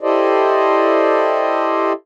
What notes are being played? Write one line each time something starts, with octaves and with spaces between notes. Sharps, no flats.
E4 G4 A4 C5 D5 D#5